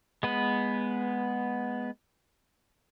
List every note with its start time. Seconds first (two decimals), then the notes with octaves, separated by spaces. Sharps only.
0.23 G#3 B3 B4